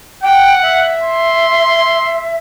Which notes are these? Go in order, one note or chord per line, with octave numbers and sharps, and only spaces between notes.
F#5 G5
E5
C6